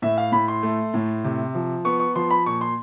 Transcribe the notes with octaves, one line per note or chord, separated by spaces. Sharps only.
A2 E5
F5
A2 B5
C6
A3
A2
C3
F3
B3 C#6
C#6
F3 C6
B5
A#2 C#6
C6